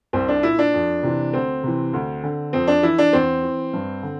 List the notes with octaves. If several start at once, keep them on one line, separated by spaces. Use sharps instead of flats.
C2 C4
D4
A#2 E4
D4
F2
C3 E3
D2 C4
C3 E3
D2
D3
F2 C4
D4
E3 E4
D4
E2 C4
E3
G2
D3